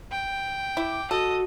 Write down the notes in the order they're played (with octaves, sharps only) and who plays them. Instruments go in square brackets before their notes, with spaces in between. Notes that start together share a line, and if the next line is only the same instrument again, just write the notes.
[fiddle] G5
[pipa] E4 [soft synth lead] D6
[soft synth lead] F#4 [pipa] A4 [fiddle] D#5